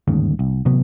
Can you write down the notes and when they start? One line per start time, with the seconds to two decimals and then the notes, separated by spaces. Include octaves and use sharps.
0.08 G1 D#2 G#2 C#3
0.39 C2
0.65 A1 C3 F#3 B3